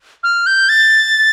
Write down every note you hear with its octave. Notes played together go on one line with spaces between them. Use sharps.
F6
G6
A6